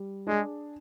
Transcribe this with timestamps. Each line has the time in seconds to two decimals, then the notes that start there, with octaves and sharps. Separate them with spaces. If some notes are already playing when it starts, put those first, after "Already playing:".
Already playing: G3
0.27 G#3 D4 G#4